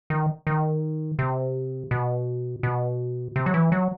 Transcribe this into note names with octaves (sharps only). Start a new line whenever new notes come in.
D#3
D#3
C3
B2
B2
C3
F#3
E3
F#3